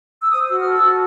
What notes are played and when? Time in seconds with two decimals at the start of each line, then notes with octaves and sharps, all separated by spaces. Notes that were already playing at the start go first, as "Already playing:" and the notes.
0.21 E6
0.31 C5 D#6
0.48 F#4 E6
0.60 F6
0.66 A4
0.72 E6
0.83 F#4